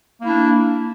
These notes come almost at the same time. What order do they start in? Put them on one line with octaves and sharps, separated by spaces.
A#3 E4 D4